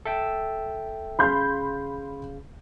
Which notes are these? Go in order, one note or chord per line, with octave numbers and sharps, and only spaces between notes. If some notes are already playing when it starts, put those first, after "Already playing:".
A4 E5 G5
C#3 F5 B5 C6 G6